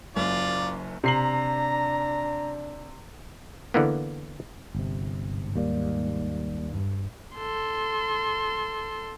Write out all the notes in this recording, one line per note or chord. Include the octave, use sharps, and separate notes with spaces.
F#1 F#2 F4 D5
C3 D4 A#5 C7 F#7
D3 E3 A#3 B3
G1 C3
G#2
D#2 G3 A#3 D5
G2
A4 C6